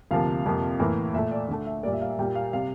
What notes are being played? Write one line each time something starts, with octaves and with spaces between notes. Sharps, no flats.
D2 C3 F3 A#3 F5
F2 C3 F3 A#3
A2 E3 A#3
A#2 A3 E5
D5
D2 D3 A3
E5
A#2 G3 A#3 D5
E5
F5
E5
A#2 G3 A#3 G5
F5
C3 G3 F5